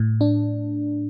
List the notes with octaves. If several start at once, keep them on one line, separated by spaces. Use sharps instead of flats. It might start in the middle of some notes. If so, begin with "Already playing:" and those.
Already playing: A2
D4